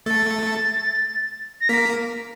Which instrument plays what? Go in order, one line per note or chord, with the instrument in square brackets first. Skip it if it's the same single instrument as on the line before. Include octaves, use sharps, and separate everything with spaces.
[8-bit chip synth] A3 A4 [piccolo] A6
[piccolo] A#6
[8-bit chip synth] A#3 A#4 [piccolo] B6